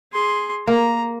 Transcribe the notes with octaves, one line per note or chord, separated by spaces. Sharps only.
G#4 C6
A#3 A#5